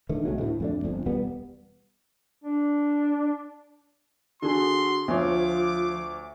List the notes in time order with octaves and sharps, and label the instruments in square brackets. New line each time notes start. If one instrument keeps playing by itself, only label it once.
[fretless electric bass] D3 D#3 A3
B1 F#3 G#3 A3
D2 A2
F2 A3 D4
G1 F2
E1 G3 B3
[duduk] D4
[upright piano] D3 G#4 A4 [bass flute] F#4 [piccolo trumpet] C6
[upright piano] D2 C#5 [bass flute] F3 [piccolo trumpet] D6